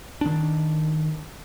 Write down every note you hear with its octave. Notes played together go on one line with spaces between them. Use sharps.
D#3 D4